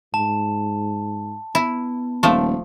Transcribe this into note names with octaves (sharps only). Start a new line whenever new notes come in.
G#2 A5
B3 E4
D#1 F3 A3